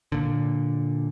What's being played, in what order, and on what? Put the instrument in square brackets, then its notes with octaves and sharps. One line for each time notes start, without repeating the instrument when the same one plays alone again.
[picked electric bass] A#2 D3